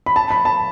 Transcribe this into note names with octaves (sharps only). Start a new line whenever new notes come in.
B5
A5
B5
A5